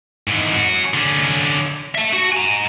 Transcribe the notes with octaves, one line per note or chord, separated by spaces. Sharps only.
G#2 E3
C#4 F#4
D3 C#4
E5 A5
F#4
G#5 A#5